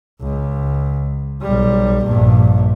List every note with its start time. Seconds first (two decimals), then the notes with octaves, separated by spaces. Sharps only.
0.21 C#2
1.42 B1 G3
2.04 A#1 G2